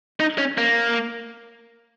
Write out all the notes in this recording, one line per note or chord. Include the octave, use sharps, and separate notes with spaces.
D#4
C#4
A#3